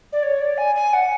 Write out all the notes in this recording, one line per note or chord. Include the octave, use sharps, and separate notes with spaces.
D5
C#5
D5
G#5
G#5
F#5